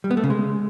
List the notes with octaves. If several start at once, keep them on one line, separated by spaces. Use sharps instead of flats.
G3
B3
A3
C#3
G#3